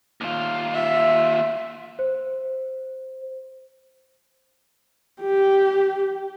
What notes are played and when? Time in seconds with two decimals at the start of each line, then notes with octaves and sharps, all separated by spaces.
0.21 D#2 F4
0.74 E5
1.99 C5
5.21 G4